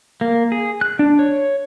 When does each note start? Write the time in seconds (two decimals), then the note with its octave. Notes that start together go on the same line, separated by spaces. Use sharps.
0.21 A#3
0.52 G#4
0.81 F#6
0.99 D4
1.19 C#5